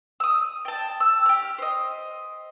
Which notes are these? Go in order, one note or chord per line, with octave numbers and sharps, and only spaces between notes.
D#6 E6
G5 A5
E6
G4 F6
C5 D#5